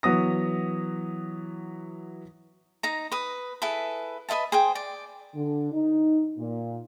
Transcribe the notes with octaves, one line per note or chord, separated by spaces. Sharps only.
E3 F#3 B3 D#6 A#6
D#4 A#5
B4 D#6
E4 G#4 A4 B4
B4 D#5 E5 A5
G#4 C5 G5
D5
D3
D#4
A#2